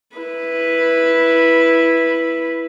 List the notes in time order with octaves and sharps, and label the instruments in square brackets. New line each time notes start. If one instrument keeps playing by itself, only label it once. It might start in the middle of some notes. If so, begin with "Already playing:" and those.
[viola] E4 B4